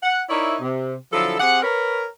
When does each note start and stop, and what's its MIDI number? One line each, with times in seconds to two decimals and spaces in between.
0.03 0.20 78
0.29 0.55 63
0.29 0.55 64
0.29 0.55 70
0.29 0.55 73
0.29 0.55 74
0.29 0.55 76
0.61 0.94 48
1.13 1.36 50
1.13 1.36 53
1.13 1.36 54
1.13 1.36 64
1.13 1.36 69
1.39 1.60 60
1.39 1.60 67
1.39 1.60 68
1.39 1.60 78
1.62 2.04 70
1.62 2.04 71
1.62 2.04 73